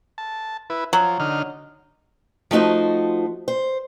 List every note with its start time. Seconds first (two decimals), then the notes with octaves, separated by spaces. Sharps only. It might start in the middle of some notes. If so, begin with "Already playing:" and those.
0.18 A5
0.70 E4 B4
0.93 F3 F#3
1.20 D3 D#4 F6
2.51 F3 A3 D#4 F#4 C5
3.48 C5